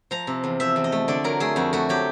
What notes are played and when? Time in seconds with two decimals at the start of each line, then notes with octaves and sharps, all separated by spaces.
0.11 F3 A#5
0.27 C3
0.44 E2
0.60 F3 E5
0.76 E2
0.84 D#5
0.92 A3
1.08 D3 D5
1.24 F#3 A#4
1.40 A3 G#4
1.56 F2 F#4
1.73 A3 F#4
1.89 F#3 G4